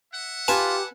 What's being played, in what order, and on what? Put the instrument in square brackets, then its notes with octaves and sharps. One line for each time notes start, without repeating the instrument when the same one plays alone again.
[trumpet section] E5 F#5
[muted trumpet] F4 [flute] G4 [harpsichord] B4 G#5 A5